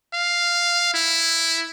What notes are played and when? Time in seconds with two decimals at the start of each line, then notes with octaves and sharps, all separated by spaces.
0.13 F5
0.94 E4